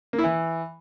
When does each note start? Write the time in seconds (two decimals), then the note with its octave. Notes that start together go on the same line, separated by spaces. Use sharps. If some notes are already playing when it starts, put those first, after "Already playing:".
0.13 A#3
0.18 E4
0.24 E3